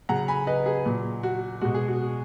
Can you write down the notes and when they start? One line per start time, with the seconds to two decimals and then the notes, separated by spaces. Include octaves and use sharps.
0.09 C#3 F#3 F#5 A#5
0.28 G#5 B5
0.47 B4 D#5
0.66 G#4
0.86 A#2 F#3
1.23 F#4
1.61 B2 G#3 F#4
1.74 G#4
1.88 F#4